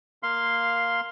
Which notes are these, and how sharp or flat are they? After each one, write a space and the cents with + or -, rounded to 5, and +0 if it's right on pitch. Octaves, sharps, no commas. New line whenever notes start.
A#3 +0 F5 +0 C6 +0